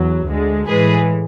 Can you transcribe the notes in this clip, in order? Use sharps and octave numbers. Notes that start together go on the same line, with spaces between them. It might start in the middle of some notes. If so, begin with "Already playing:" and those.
Already playing: E2 F#3
D2 D3 G#3
A2 E3 G#3 G#4 B4